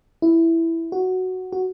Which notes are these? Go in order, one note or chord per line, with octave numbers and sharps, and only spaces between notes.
E4
F#4
F#4